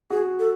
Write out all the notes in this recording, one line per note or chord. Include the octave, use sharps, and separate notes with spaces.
F#4 G#4
A4